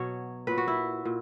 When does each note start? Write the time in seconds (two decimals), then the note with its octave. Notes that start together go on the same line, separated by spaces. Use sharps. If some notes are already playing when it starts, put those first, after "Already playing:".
Already playing: B2 F#3 C#5
0.47 A#2 F#3 B4
0.57 F#4
0.68 E4
1.05 A#2